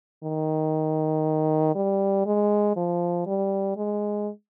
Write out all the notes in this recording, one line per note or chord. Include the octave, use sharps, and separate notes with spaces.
D#3
G3
G#3
F3
G3
G#3